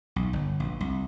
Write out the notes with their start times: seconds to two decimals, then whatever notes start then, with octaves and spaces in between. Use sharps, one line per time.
0.16 B1
0.33 G1
0.60 A#1
0.80 C2